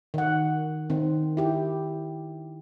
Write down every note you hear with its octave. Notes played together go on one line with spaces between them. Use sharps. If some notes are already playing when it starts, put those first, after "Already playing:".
D#3 F#5
D#3 C4
E4 G4